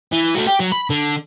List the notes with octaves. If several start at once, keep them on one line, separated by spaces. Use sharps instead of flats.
E3
A3 F#4
G4
F#3
B5
D3